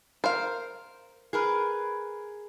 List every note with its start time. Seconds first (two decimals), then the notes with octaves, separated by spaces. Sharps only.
0.24 A#4 C5 F5
1.33 G#4 A#4 B4